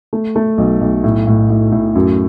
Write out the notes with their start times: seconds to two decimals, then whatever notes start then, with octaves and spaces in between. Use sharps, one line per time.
0.13 A3
0.36 A3
0.58 B1
0.81 B1
1.04 A2
1.27 A2
1.50 A2
1.72 A2
1.95 F#2